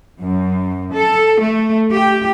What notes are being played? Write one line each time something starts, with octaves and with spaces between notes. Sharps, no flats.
F#2
A4
A3
G4